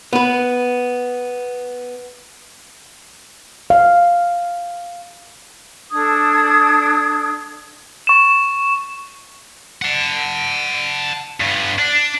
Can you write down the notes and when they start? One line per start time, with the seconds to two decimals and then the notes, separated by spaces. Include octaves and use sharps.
0.13 B3 B4
3.70 F5
5.92 D4 A4 D#6 G#6
8.07 C#6 E7
9.82 F#5 A5
11.40 G2 B3
11.79 D4